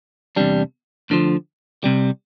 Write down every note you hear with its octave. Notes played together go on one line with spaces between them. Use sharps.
E2 C3 G3 D4
D2 D3 F3
C2 C3 G3